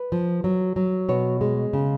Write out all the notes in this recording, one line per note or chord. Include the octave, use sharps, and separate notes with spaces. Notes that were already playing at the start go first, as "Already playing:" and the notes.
Already playing: B4
F3
F#3
F#3
B2 C#5
G#3
C#3